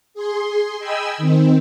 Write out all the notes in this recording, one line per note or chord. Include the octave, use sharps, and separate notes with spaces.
G#4 C6
D#5 G5 G#5 B5 E6
D#3 C4